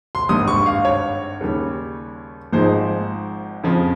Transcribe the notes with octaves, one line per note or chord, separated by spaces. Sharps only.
C6
G#1 G2 G3 D#6
C#6
F5
C#5
D#2 C#3 G3
G#1 G#2 F3 G#3 C5
F2 C#3 F3